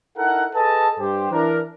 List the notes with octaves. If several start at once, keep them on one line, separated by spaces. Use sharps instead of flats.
D#4 E4 A4 A#4 F#5
G#4 A4 B4 D#5 G#5 A5
G2 G4 C5
E3 D4 A#4